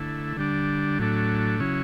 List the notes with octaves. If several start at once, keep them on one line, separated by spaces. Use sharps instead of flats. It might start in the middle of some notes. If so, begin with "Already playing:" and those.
Already playing: D3 A3 E4
D3 G3 D4
A2 F#3 A3 D4
C#3 F#3 C#4 E4